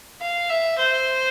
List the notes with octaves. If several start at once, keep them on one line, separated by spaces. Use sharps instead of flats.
F5
E5
C5